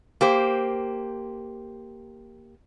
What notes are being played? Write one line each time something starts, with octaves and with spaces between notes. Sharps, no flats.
A#3 G4 C5